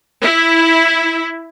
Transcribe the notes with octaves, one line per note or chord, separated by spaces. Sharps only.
E4